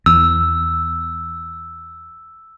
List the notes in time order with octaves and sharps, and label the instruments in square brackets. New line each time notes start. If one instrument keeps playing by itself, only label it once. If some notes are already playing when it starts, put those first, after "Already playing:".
[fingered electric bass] E2 [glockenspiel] E6